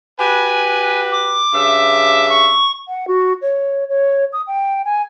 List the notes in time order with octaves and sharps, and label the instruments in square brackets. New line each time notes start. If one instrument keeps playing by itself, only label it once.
[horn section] F#4 G4 B4 [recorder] G#5
[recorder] D6
[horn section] G2 C#3 E5
[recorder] C#6
[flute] F#5
F#4
C#5
C#5
D#6
G5
G#5